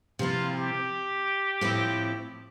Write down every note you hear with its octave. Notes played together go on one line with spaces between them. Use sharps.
C3 F3 C4 E4 F4
G4
A2 F3 C4 E4